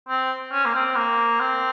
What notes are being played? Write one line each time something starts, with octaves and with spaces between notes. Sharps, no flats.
C4
C#4
A#3
C4
A#3
C4